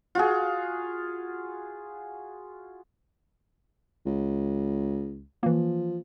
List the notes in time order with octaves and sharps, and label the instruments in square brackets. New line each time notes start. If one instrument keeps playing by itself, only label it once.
[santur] F4 F#4 G#4
[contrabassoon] C#2
[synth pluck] E3 A#3 [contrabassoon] F3